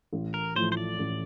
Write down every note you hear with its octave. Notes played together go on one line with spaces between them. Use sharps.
A1
A#4
A2 F3 A3 C5
C5
D5
A1